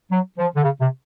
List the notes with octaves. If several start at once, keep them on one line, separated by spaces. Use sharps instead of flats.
F#3
F3
D3
C#3
C3